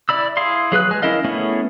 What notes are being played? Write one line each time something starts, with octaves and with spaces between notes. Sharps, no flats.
E4 D5 B5 E6
E4 G#4 F5 C6
F#3 G#4 B4 F#6
G#3 G#5
C#4 E4 A#4 D#5 F5
A3 B3 C#4 E4 G#4